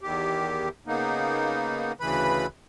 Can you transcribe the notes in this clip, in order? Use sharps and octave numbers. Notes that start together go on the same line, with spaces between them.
E2 D#3 G4
C#3 A#3 B3 D#4
D2 C#3 E3 B4 B5